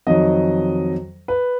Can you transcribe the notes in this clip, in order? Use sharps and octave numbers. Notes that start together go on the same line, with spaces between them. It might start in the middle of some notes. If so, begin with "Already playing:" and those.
F2 D#3 F#3 D#5
B4